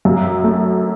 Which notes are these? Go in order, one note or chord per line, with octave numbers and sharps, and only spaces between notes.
F#2
A3